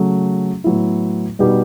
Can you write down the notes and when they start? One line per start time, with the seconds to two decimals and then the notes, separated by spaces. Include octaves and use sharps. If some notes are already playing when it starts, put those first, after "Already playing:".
Already playing: C#3 F#3 A3
0.64 A2 F#3 B3 E4
1.39 B2 G3 B3 D#4 G4